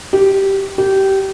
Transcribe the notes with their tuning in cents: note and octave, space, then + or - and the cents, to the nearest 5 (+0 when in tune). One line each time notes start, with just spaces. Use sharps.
G4 -10
G4 -20